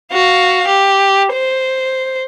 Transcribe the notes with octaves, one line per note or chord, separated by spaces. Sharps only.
F#4 F5
G4
C5